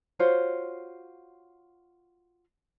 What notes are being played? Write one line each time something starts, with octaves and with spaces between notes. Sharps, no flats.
F4 F#4 C5 C#5